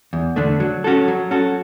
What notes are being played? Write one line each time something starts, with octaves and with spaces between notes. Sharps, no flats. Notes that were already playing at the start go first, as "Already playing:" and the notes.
E2
D3 A3 D4
F#3
C#4 F#4 A4
F#3
C#4 F#4 A4